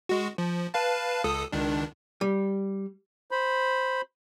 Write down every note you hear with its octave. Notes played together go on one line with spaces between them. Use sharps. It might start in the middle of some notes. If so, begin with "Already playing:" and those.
G#3 F#4
F3
B4 F5 A5
C#2 A4 D#6
C#2 D#3 D4
G3
C5 B5